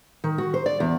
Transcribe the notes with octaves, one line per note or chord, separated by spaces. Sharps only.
D#3
F#4
C5
D5
E2